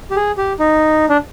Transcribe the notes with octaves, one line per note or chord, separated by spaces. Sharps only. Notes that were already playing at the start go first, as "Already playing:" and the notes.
G4
G#4
G4
D#4
D4